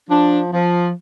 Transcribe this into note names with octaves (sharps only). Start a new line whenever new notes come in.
F3 D4
F3